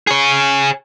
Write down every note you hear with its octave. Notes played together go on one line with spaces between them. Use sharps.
G#4 C#5